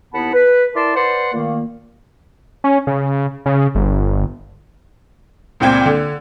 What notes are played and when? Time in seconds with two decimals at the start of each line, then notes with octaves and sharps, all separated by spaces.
0.13 D#2 B3 E4 F#5 A5 B5
0.34 B4
0.75 E4 A#4 D5 A5 C6 D6
0.95 B4 C5 D5 F#5 C6
1.33 A#2 D#3 A3 A#3
2.64 C#4
2.87 C#3
3.46 C#3
3.75 G1
5.60 C#2 A#2 C4 G5 G#6
5.85 D3